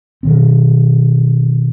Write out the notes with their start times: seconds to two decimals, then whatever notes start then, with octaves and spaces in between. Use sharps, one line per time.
0.23 B2 D#3 C4